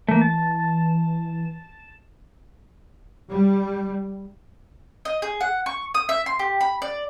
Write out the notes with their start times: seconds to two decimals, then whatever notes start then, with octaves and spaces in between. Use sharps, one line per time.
0.08 E3 A3 A#3
0.21 A5
3.30 G3
5.05 D#5
5.22 G#4
5.41 F#5
5.66 C#6
5.94 D#6
6.09 E5
6.26 C6
6.39 G4
6.61 B5
6.82 D5